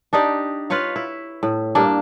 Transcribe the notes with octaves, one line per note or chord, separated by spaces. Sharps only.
D4 D#4 G4 D5
F4 B4 C#5 F5
E4
A2
G2 A#3 D4 D5